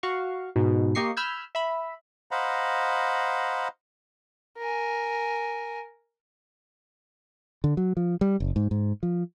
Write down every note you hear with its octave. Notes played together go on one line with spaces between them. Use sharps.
F#4 F5 C#6
G#2 B2
A#3 G4 D#5 C#6 C7
B5 E6 F6 G6 G#6
E5 B5
C5 D#5 F5 F#5 A#5 B5
A#4 G#5
D3
F#3
F3
G3
F#1
G#2
G#2
F3